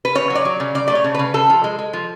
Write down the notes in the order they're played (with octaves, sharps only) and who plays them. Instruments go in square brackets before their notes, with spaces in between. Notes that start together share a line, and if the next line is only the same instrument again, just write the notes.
[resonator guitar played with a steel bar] B4
C#3 C#5
F#3
D5
F#3
C#3
C#3 D5
A3 D5
C#5
C#3
C#3 B4
C#3 A4
F3
G#3
G#3
F3